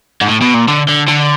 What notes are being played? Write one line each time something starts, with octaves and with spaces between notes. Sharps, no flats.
G#2
A2
B2
A#2
D3
D3
D3